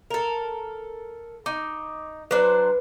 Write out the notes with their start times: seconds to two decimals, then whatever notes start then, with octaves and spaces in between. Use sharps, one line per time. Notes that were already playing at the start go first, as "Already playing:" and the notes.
0.11 A4 A#4
1.46 D#4 D6
2.31 F#3 D4 B4 C5